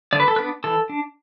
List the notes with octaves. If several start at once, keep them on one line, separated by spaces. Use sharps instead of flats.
D3 D5
B4
A4
B3 D4 B4
E3 A4
D4